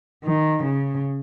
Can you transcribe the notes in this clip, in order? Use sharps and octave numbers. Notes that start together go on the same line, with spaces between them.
D#3
C#3